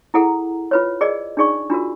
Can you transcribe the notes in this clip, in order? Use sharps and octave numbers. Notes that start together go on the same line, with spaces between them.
E4 G#4 A4 F#5 A#5
F4 B4 C#5
G#4 A#4 D5 D#5
D4 D#4 G#4 D5 C#6
D4 F4 F#4 A#4